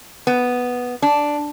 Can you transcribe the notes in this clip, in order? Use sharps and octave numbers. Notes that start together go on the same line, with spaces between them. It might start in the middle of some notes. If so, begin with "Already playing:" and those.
B3
D4